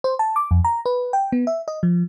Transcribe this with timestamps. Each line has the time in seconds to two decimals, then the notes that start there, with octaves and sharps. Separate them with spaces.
0.04 C5
0.19 A5
0.36 D6
0.51 F2
0.64 A#5
0.86 B4
1.13 G5
1.32 B3
1.47 E5
1.68 D#5
1.83 F3